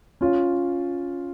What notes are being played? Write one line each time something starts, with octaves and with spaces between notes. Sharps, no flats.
C#4 F4